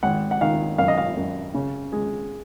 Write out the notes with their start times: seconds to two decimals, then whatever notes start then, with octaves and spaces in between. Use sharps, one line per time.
0.03 G#1 F#5
0.31 F#5
0.41 D#3 F5
0.78 F#2 F5
0.88 D#5
0.98 F5
1.17 F#2
1.54 C#3
1.92 G#3